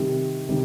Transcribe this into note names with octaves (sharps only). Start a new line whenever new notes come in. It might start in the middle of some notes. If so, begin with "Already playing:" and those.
Already playing: C3 D#3 G3
C3 D#3 G3